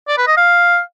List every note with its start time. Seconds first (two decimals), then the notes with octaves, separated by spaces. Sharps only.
0.08 D5
0.18 B4
0.27 D#5
0.37 F5